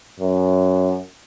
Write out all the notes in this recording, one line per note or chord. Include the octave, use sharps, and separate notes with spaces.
F#2